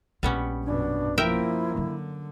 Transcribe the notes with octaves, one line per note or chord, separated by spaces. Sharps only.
A#1 G3 B3 C#4 F4
F#2 B2 D4
F3 A#3 E4 A#4 E5 G5
D3 F#3